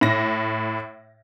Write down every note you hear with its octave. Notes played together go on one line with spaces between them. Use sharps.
A2 A#6